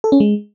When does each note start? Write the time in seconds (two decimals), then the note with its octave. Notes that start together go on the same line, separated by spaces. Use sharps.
0.04 A4
0.12 C#4
0.20 G#3